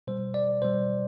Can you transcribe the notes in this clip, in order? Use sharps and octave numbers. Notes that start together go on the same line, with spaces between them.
B2 G3 C5
D5
B2 G3 C5